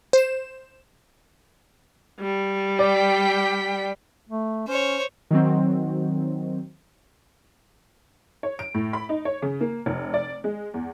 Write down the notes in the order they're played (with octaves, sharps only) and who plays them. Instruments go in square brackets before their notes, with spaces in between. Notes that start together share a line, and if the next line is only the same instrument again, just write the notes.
[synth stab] C5 E7
[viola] G3
[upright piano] D5 [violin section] G5 B6
[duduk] A3
[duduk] C#4 [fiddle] C5 C#5
[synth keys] D#3 F#3 C4
[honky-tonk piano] C#5
D7
A2
B5
D#4
C#5
C#3
A#3
F1
D5
G#3
E2